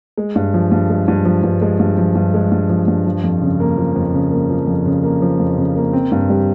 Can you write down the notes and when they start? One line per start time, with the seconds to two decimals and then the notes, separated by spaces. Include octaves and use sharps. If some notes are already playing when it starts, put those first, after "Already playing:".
0.18 G#3
0.36 G2
0.54 F3
0.72 G2
0.90 G#3
1.08 G2
1.25 F3
1.43 G2
1.62 G#3
1.80 G2
1.98 F3
2.15 G2
2.34 G#3
2.52 G2
2.69 F3
2.88 G2
3.06 F3
3.24 F2
3.42 C#3
3.60 A#3
3.77 F3
3.96 F2
4.13 C#3
4.31 A#3
4.50 F3
4.67 F2
4.86 C#3
5.03 A#3
5.22 F3
5.40 F2
5.58 C#3
5.76 A#3
5.93 C4
6.12 G2
6.30 G3